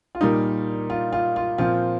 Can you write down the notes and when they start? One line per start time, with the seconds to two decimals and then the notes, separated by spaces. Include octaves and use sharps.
0.15 F4
0.21 A#2 G3 A#3 D#4
0.90 F4
1.13 F4
1.36 F4
1.58 A#2 F3 C4 F4